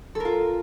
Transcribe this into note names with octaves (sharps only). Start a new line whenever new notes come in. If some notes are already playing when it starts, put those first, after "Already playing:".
F4 A4 A#4